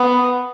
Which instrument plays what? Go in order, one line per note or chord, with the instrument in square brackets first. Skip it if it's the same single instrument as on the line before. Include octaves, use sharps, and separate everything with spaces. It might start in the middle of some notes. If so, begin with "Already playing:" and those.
Already playing: [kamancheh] B3